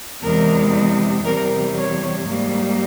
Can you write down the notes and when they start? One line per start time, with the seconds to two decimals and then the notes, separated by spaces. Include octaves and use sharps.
0.22 E2 C3 E3 G#3 A#4
1.24 E2 C3 G3 A#4
1.76 C#5
2.26 G#2 G3 A#3